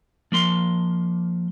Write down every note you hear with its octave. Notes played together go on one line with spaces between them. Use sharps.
F3 A#3 C6